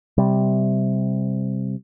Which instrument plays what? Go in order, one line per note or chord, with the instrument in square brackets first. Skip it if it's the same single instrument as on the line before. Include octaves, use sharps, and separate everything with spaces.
[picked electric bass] C3 G3